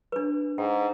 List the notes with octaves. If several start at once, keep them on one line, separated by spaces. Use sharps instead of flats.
D4 B4
G#2 G5